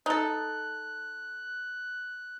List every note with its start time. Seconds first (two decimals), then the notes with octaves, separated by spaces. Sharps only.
0.06 D#4 A4 F#6